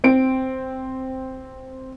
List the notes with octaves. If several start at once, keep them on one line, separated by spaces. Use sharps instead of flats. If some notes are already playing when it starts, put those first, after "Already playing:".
C4 D7